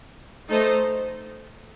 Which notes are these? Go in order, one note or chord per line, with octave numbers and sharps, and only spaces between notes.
A3 D#4 A4 C5 D#5